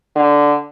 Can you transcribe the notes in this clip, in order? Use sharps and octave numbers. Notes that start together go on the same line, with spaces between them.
D3